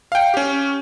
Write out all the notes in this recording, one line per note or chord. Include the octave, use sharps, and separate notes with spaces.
F5 G5
C#4 G4